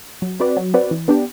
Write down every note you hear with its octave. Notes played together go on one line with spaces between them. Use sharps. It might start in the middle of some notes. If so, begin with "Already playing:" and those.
F#3
C4 F#4 B4 D5
F#3
C4 F#4 B4 D5
E3
B3 D4 G4